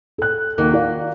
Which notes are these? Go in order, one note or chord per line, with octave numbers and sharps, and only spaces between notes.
A4 F#6
D#2 D#3 F#3 A#3
F4 D5 F5